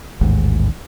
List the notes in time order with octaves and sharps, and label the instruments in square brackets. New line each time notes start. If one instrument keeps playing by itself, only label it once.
[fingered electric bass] A1 D#2 G#2